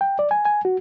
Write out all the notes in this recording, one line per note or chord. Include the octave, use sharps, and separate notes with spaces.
G5
D5
G#5
G#5
F#4